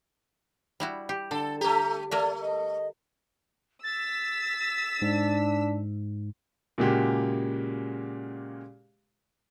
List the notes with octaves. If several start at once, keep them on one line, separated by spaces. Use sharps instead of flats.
G3 E4 F#4
G4
D3 A4
A3 G4 A#5
A3 A#3 A#4 D5 E5
D#5
E6 A6 B6
G#2 D4
A#2 C#3 G#3 A#3 F#4 G4